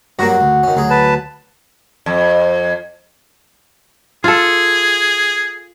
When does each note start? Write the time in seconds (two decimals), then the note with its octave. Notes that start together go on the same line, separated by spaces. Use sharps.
0.19 G2 F#3 A#3 F#4
0.41 D2
0.63 D#3 C#4
0.76 D2 F#3 G#4
0.90 B4 A5
2.06 F2
4.24 F4 G#4 A4